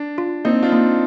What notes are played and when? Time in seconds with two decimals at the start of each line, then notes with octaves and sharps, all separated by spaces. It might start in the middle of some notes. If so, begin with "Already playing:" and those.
Already playing: D4
0.18 F4
0.45 A#3 C4 D#4
0.63 D4 F4
0.72 A#3